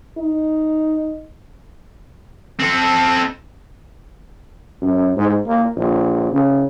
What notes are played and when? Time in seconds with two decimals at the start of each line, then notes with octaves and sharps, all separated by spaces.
0.18 D#4
2.60 C4 A4
4.81 F#2
5.16 G#2
5.46 A#3
5.76 A#1
6.31 C#3